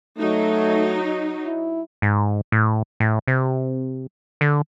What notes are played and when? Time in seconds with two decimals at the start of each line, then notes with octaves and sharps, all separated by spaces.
0.18 F#3 A3 D#4
1.45 E4
2.02 G#2
2.52 A2
3.00 A2
3.27 C3
4.41 D3